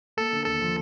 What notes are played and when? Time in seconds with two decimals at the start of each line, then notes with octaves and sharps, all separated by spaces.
0.17 A#3 A4
0.33 D3
0.46 D#2 A4
0.60 F3